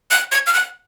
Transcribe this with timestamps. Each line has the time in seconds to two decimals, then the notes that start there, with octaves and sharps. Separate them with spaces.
0.11 F#6
0.32 G#6
0.46 F6
0.54 F#6